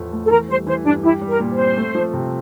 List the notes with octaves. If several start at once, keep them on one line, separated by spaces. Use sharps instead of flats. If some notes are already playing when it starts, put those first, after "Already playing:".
Already playing: E2 A2 F3 A3
A3
A4
E3 A#4
G3 C5
E3 C5
G2 D4
E4 G4
G3
A#4
A#2
C5
C4
A3
F3
C3